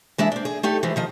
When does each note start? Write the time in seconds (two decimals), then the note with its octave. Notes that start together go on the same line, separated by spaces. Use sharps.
0.18 E3 G#3 D4 E5
0.32 C4 D4
0.45 G#4
0.63 A3 D#4 G4
0.83 E3 F3 G#3
0.96 D#3 F3 D#5